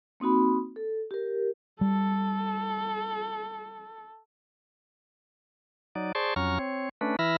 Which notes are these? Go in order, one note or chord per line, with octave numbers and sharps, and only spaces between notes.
A#3 C4 D#4 F#4 B5
A4
G4 A#4
G3 A4
F#3 D#4 D5
G#4 C5 D5 A5 C6 C#6
F2 F#3 C#4 A#5 C#6 F6
C4 C#5
A3 C#4 D4 B4
E3 E4 E5 B5 F6 A#6